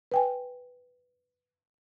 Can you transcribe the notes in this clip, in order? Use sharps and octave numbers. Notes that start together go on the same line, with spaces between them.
B4 G5 G#5